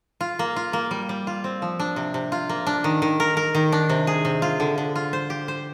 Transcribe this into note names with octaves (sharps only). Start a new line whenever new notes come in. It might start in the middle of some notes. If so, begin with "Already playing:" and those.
F4
A#3
F4
A#3
G3
G3
F4
C4
F3
D4
C3
C3
F4
A#3
D4
D#3
D#3
A#4
A#4
D#3
D4
C3
G#4
C3
F4
D3
D3
F4
C5
G4
C5